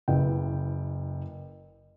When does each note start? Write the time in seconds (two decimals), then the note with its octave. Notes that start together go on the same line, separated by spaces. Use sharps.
0.08 F#1 E4 B4 G5